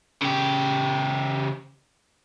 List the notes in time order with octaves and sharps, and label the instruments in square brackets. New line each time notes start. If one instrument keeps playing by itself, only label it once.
[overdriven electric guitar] C#3 G4